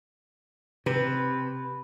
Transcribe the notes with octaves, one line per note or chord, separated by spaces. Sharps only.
C3 B4